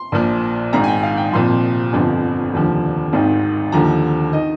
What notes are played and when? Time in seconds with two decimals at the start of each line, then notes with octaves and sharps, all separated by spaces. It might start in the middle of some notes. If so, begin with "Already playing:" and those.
Already playing: C6
0.12 A#1 A#2 F3
0.73 G#1 G#2 D#3 A#5
0.84 G#5
0.88 G5
1.03 F5
1.17 G5
1.32 C2 A#2 F3 C6
1.93 G1 F2 D3 F3
2.53 F1 D#2 D3 F3
3.13 G#1 G#2 D#3
3.72 D#2 D3 F3 A#5
4.33 D#3 D#5